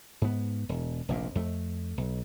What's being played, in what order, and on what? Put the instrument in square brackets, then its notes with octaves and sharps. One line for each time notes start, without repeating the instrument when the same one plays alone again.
[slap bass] G#2 B3
E1
F1 A#1 A#2
F2 A3
B1